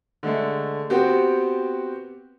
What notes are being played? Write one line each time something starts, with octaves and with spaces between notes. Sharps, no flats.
D3 G#3 A3
B3 C4 F#4 G4